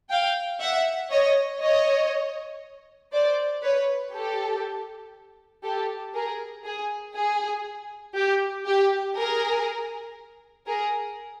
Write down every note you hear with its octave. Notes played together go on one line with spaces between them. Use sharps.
F5 G5
E5 F#5
C#5 D#5
C#5 D#5
C5 D5
B4 C#5
G4 A4
G4 A4
G#4 A#4
G#4
G#4
G4
G4
G#4 A#4
G#4 A#4